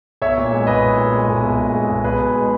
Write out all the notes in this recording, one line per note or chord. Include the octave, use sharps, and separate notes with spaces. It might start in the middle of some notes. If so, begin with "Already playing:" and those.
B1 C#5 E5
A#2
G#3
B1 B4 D#5
B1
A#2
G#3
B1
B1
A#2
G#3
B1
B1 G#4 B4
B2
G#3